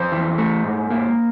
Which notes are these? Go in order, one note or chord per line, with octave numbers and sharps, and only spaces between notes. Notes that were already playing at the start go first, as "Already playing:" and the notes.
Already playing: F2 C5
E3
A3
G#2
A#3